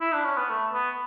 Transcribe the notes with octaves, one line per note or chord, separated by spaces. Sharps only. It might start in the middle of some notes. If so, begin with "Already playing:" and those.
E4
D4
C#4
B3
A3
B3